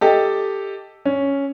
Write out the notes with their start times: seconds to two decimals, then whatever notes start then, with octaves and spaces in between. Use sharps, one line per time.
0.01 G4 A4 D#5
1.05 C#4